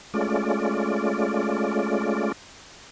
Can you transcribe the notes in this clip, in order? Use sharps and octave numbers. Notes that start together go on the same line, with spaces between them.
G#3 A3 C#4 F4 D5